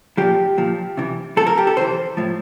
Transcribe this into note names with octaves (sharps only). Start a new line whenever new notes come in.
A#2 F3 G4
A#2 F3
C3 E3
A2 F3 A4
A#4
G4
A4
C3 E3 C5
A2 F3